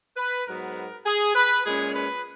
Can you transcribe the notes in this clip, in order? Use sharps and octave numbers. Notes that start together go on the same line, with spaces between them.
B4
G#2 F#3 B3 A#4
G#4
B4
A#2 G#3 C#4 G#4
B4